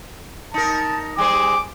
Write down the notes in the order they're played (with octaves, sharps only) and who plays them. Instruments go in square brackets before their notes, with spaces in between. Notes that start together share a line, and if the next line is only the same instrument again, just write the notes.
[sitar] D#4 A#4 [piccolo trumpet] A5
[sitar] G3 G#4 C5 [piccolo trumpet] D6